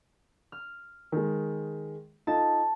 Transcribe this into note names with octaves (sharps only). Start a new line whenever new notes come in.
F6
D#3 G#3
D#4 F4 A4 A5